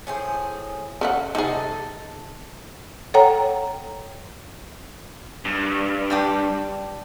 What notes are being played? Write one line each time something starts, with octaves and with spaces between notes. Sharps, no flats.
A2 G#4 C5
C#3 A3 F#5
C3 D#4 G#4 A4
A4 C#5 F#5 G5 A#5
G2
G3 D4 G4